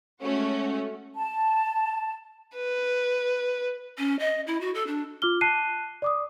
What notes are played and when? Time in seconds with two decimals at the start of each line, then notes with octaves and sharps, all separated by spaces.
0.22 G#3 A3 C#4 F#4
1.16 A5
2.56 B4
3.98 C#4
4.19 D#5
4.47 E4
4.60 F#4
4.74 A4
4.87 D4
5.22 F4 D6 F6 G7
5.41 A5 F#6 C7 D#7
6.02 D5 D6 D#6